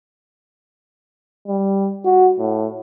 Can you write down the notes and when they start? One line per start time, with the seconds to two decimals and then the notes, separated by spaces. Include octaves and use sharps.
1.48 G3
2.05 F#4
2.39 A2